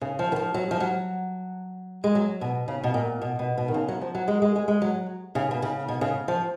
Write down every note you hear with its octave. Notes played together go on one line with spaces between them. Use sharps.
C#3
F3
D#3
F3
F#3
F3
F#3
G#3
F#3
B2
C#3
B2
A#2
B2
B2
B2
D#3
C#3
F#3
F3
F#3
G#3
G#3
G#3
G#3
F#3
C#3
B2
C#3
B2
C#3
F3